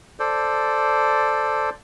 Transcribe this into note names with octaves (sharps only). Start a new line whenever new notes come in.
A4 C5 D5